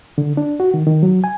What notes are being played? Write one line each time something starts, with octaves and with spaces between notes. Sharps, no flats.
D3
D4
F#4
D#3
D#3
F#3
G#5